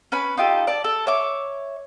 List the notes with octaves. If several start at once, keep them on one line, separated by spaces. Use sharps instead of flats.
C#4 B4 B5
D#4 F4 G4 A4
D5 A5
A4
C#5 E5 D6